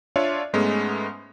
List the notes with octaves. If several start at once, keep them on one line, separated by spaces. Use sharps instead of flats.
D4 F4 C#5 D5 E5
G#2 G#3 A3 B3 C#4